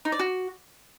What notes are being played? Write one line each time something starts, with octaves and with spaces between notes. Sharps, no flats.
D#4
D5
F#4